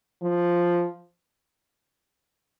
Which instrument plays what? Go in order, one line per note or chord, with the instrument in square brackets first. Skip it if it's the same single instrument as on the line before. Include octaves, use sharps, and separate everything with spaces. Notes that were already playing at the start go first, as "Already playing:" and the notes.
[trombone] F3